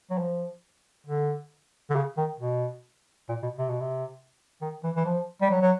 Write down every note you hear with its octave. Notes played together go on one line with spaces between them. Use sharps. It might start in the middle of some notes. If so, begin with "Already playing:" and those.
F#3
F3
D3
D3
C#3
D#3
B2
A#2
B2
C3
B2
C3
D#3
E3
E3
F3
G3
F#3
F#3